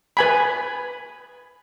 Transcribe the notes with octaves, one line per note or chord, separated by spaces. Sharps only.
B4 G#5 B5